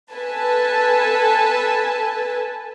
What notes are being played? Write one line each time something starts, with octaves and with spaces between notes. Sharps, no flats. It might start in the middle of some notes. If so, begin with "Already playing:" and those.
A4 B4 G#5 A5